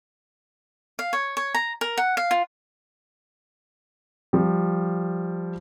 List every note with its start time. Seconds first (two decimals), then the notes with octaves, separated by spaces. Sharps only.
0.99 F5
1.13 C#5
1.37 C#5
1.55 A#5
1.81 A#4
1.98 F#5
2.17 F5
2.31 F4
4.33 F3 G3